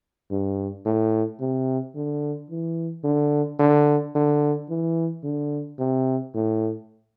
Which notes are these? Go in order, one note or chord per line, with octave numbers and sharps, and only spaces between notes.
G2
A2
C3
D3
E3
D3
D3
D3
E3
D3
C3
A2